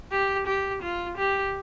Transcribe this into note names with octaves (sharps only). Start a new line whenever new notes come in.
G4
G4
F4
G4